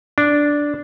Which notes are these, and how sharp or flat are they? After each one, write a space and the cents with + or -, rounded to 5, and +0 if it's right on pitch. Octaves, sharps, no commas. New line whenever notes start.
D4 -5